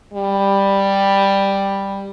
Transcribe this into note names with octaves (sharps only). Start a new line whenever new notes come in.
G3